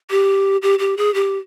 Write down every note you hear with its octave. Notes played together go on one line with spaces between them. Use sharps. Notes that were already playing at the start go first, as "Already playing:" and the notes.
G4
G4
G4
G#4
G4